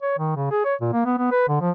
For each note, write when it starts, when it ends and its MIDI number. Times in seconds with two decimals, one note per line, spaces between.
0.02 0.18 73
0.18 0.31 51
0.36 0.50 49
0.51 0.62 68
0.65 0.75 73
0.81 0.90 46
0.93 1.03 58
1.05 1.14 59
1.18 1.30 59
1.31 1.47 71
1.48 1.58 50
1.61 1.71 53